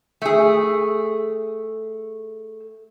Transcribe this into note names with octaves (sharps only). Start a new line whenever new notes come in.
A3 G#4